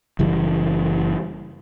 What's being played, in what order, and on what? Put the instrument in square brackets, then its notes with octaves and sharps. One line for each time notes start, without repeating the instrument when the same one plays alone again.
[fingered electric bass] F#1 C#3 E3 G3